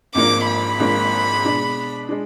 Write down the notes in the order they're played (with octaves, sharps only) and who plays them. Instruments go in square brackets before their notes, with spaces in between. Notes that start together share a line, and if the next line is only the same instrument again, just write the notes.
[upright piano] G#1 G#2 F3 A#3 D4 [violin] D6
[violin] B5
[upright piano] G#1 G#2 F3 A#3 D4
B2 G#3 D4
G#3 D4